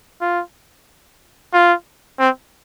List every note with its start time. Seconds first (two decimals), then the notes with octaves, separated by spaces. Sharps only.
0.21 F4
1.53 F4
2.19 C4